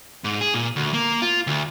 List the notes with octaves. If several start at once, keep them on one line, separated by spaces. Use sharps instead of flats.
G#2
G#4
A#2
D2
A#3
F4
D2